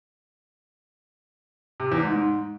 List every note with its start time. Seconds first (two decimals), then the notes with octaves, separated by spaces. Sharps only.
1.80 C3
1.92 E2
2.04 G#2
2.16 G#2